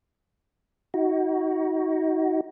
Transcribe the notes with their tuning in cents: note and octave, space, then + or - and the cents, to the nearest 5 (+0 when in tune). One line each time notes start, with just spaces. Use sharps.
D#4 +35 F#4 +10